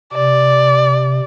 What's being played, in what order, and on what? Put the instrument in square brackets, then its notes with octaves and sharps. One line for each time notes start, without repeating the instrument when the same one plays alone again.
[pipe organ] C3 [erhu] D5